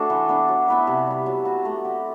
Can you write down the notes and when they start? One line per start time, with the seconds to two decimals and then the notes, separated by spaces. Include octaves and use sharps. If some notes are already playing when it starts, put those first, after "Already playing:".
Already playing: A3 D4 F#4 A4 C5
0.10 E3
0.29 B3 D4
0.48 F#3
0.68 B3 E4 B4
0.87 C3
1.07 G3 B3
1.26 F#3
1.45 B3 F#4
1.65 A3
1.85 C4 G4